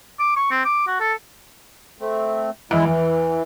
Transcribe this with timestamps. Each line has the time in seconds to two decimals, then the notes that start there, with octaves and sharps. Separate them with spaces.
0.19 D6
0.36 C#6
0.51 C4
0.65 D6
0.87 F#4
1.00 A4
1.98 A3 C4
2.71 E2 G#3 E4
2.85 E2 E3